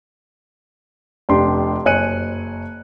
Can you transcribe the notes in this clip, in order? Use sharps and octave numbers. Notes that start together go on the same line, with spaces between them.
F1 D4 G4 C6
F#1 C#5 G#5 F#6 C#7 D#7